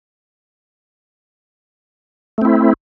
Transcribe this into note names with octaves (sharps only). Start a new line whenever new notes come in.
A3 C4 E4